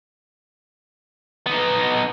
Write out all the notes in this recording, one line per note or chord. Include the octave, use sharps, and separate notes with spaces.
B3 D#4